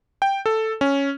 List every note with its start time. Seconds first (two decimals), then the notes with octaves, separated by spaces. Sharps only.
0.22 G5
0.46 A4
0.81 C#4